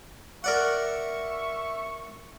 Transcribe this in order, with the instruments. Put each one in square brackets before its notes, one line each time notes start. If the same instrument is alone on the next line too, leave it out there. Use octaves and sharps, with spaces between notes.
[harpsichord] A#4 D5 F#5 [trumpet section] E5 C#6